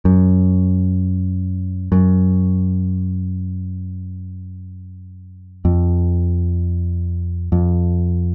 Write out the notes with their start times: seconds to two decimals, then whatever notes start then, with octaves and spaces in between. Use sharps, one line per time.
0.05 F#2
1.92 F#2
5.65 F2
7.52 F2